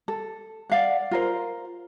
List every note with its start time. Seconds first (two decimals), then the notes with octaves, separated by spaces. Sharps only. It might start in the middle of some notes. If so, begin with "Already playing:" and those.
0.08 A4
0.70 D5 F5 F#5
1.11 F4 A#4 C5